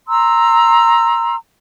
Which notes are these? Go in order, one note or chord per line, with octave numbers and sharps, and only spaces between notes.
A#5 C6 E6